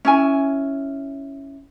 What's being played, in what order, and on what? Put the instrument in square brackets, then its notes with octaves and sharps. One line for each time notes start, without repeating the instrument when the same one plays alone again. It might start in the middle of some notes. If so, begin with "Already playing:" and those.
[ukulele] C#4 E4 G#5